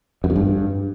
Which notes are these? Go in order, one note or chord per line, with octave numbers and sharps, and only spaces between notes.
F#2
F2
G2